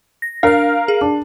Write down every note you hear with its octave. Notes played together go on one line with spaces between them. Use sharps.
A#6
D4 A#4 F5 F6
G#4
D4